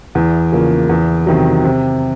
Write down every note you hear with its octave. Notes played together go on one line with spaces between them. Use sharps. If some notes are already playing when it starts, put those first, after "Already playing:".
E2
C#3 F3 A#3
E2
C3 D#3 F#3
C3